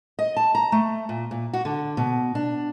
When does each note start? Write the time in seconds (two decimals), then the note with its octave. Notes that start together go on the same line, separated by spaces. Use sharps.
0.19 D#5
0.37 A5
0.55 A#5
0.72 A3
1.09 A#2
1.31 A#2
1.53 F#4
1.65 D3
1.97 B2
2.35 D4